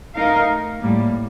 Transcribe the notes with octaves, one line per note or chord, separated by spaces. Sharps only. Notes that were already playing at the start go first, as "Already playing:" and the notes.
A3 D#4 A#4 F5
A2 G3 A#3